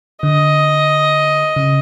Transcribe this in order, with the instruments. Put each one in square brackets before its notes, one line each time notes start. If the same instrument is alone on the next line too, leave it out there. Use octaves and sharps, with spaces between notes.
[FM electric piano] D3 [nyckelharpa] D#5
[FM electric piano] C#3